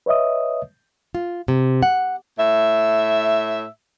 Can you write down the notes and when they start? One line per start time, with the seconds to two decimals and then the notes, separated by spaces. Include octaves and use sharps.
0.06 B4 C#5 D#5 E5 D#6
1.15 F4
1.48 C3
1.83 F#5
2.39 A2 E5